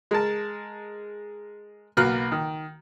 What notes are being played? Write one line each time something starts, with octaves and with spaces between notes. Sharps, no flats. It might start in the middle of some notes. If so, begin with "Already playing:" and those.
G#3 A#4 A5
B1 A#3 F#4 B4 F6 F#6
D#3